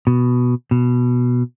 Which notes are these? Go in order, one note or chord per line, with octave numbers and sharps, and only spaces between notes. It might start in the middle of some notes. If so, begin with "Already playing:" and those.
B2
B2